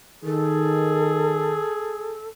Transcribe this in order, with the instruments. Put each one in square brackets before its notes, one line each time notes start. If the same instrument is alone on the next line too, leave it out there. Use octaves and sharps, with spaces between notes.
[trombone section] D#3 [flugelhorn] G#4 [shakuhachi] A4